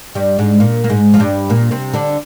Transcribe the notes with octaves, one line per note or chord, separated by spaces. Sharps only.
G2 G3
G#2 G#3
A#2 A#3
A#3
G#2 G#3
F3
G2 G3
A#2 A#3
C3 C4
D3 D4